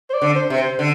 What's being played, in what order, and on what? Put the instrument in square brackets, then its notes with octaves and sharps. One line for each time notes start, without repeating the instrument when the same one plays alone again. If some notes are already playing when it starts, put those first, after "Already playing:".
[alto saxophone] C5
D5
[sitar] D3
[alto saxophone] C5
[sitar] C3
[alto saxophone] C5
[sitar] D3